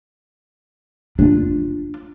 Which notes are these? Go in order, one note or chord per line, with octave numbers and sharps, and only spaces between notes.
D4 F4